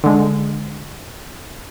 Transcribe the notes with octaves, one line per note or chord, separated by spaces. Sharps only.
D3 G#3